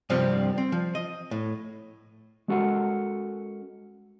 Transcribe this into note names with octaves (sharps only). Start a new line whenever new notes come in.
G2 C3 F3 G3 C4
C4
F3
D#5
A2
G#3 C#4 F#4 A4 A#4 F#5